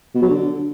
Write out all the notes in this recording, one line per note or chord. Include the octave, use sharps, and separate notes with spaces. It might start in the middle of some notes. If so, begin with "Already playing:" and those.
B2
F#3
D3